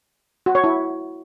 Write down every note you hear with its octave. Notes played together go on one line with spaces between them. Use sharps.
F#4
C#5
E4